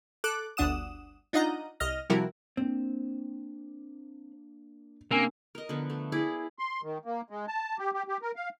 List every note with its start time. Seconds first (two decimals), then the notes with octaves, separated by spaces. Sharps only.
0.24 A4 D6 F#6
0.57 G1 D2 D4 F#5 D#6 E7
1.33 D4 D#4 F4 D#5 F#5 A#5
1.80 C2 D#5 F6 A#6
2.10 C3 F3 G3 E4 F#4 A#4
2.57 A#3 C4 D4
5.11 C3 A#3 C#4 D4 A#4 G#5 E6
5.55 A#4 D#5
5.69 D3 F3 B3
5.90 A3
6.12 E4 G#4 D5
6.59 C6
6.83 D#3
7.05 A#3
7.30 G#3
7.48 A5
7.79 G4
7.94 G4
8.08 G4
8.22 A#4
8.36 F5